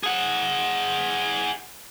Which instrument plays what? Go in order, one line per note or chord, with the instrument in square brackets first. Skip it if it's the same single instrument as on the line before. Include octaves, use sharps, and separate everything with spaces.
[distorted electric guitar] G#4 F#5